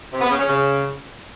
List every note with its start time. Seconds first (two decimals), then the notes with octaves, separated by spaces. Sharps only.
0.12 C3
0.21 B3
0.30 C#3
0.39 C#4
0.48 C#3